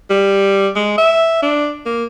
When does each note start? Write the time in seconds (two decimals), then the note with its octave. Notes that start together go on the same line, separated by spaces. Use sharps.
0.10 G3
0.75 G#3
0.97 E5
1.42 D4
1.86 A#3